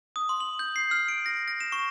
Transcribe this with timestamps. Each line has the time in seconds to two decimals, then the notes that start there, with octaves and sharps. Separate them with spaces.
0.16 D#6
0.29 C6
0.40 F#7
0.59 G6
0.76 C7
0.91 F6
1.08 D7
1.26 A#6
1.48 A#6
1.60 E7
1.72 C#6